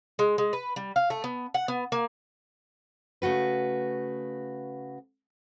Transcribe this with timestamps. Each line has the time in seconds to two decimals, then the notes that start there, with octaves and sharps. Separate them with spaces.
0.19 G#3
0.38 G#3
0.53 B4
0.76 G3
0.96 F5
1.10 A3
1.24 B3
1.54 F#5
1.68 B3
1.92 A#3
3.22 C#3 A3 F#4 B4